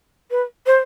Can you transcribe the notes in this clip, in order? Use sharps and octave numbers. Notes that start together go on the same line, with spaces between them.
B4
C5